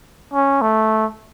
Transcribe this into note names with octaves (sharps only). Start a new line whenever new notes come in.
C#4
A3